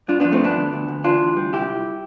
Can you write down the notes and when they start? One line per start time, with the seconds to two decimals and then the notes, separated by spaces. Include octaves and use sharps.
0.08 G2 D4 F4
0.20 F3 B3 D4
0.32 A3 C4
0.41 G2 B3 D4
0.56 D2
0.73 D2
0.88 D2
1.04 E3 D4 F4
1.21 D2
1.37 G3
1.52 C2 E4 G4
1.68 C2